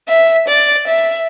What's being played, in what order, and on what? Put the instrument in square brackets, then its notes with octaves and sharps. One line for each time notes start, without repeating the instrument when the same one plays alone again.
[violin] E5
D5
E5